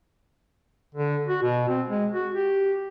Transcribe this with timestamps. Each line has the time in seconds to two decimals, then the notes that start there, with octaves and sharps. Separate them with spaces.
0.95 D3
1.28 F#4
1.43 B2
1.69 C4
1.88 G#3
2.13 F#4
2.34 G4